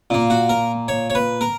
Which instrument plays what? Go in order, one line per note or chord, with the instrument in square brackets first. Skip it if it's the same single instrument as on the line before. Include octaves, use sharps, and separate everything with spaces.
[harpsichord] A#2 A#3
F#4
A#4
C#5
C#5
B4
A#4